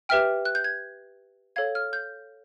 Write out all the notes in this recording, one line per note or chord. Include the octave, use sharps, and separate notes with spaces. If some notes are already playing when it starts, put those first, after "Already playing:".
G4 B4 E5 G5 F6
F#6
G6
G#6
A4 C#5 F5 G#6
F6
G6